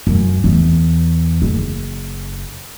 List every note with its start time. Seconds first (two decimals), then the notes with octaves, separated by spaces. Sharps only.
0.07 F#2
0.44 E2
1.42 F#1